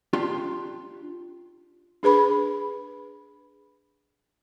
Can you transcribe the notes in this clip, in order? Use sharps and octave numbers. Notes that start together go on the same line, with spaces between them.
D4 F4 G4 C6
D4 G#4 B4 B5